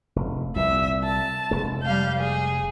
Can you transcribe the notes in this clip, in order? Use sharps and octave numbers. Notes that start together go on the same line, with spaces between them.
F1
C2 A#2 E5
A5
F1 G#3
G3 F5 G6
G#4